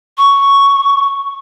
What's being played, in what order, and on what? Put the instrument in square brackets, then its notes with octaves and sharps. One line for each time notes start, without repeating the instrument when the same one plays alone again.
[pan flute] C#6